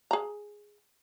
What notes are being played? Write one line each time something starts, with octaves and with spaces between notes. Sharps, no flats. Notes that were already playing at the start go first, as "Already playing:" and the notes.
G#4 A#5